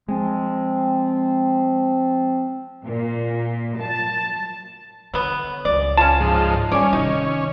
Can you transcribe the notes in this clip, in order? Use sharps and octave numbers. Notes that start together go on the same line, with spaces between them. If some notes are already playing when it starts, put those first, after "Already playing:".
F3 G#3 C4
A#2
A5
D3 F#3 B3
C#2 D5
C#4 F4 A5
G#2 F3
G3 C#4 D5 G#5
C3 D#3 D#4